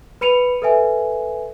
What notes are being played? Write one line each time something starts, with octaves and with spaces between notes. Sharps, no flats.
B4 B5 C#7 D#7 F7
A4 B4 E5 G#5